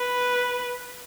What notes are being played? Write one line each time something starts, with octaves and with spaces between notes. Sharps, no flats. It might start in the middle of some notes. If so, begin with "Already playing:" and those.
Already playing: B4